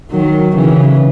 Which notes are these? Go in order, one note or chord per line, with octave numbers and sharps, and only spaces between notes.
D#3 F#3
C#3 E3